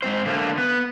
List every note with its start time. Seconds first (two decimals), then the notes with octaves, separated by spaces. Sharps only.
0.02 G#2 C4 C5
0.26 D3 A3 A#3
0.58 B3